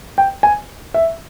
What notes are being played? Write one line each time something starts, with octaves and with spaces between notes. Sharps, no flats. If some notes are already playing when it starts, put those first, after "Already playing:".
G5
G#5
E5